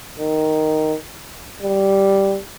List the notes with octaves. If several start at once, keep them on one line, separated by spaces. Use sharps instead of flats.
D#3
G3